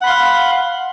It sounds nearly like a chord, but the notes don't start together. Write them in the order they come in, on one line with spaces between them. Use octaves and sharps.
F#5 B5 C6 F5